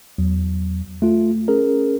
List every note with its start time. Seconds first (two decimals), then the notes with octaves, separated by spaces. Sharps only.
0.18 E2 F#3
1.02 A3 F4
1.48 C#4 G#4 A#4